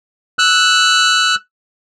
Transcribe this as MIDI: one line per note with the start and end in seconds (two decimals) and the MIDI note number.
0.39 1.35 88
0.39 1.35 90